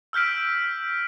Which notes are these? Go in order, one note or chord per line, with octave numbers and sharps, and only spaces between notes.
E6 F6 G6 B6 D7